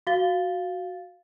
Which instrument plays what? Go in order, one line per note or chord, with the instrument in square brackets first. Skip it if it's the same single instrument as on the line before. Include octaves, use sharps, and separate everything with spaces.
[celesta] F#4 F5 A6 G7